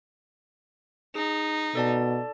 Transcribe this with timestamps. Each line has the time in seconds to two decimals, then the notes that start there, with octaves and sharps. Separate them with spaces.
1.15 D#4 G#4
1.75 B2 A4 D5 A5